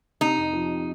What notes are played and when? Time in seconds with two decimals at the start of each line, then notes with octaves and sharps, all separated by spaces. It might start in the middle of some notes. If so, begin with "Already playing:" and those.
0.21 C3 D#4
0.37 F2
0.53 F3